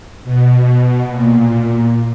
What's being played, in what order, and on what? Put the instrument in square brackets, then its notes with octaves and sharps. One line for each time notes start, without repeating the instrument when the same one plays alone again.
[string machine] B2
A#2